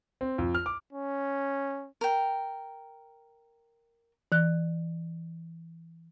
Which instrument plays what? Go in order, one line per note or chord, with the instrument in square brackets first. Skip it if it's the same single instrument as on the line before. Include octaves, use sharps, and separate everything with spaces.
[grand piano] C4
F2
F6
D6
[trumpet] C#4
[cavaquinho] A#4 G5
[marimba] E3 F#6